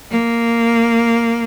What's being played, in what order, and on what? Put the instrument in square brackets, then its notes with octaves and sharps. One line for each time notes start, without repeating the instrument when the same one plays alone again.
[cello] A#3